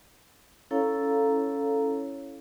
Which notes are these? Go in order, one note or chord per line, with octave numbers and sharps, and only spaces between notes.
C#4 E4 A4 C#5 F5 A#5